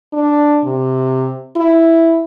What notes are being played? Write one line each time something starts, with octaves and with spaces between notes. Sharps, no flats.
D4
C3
E4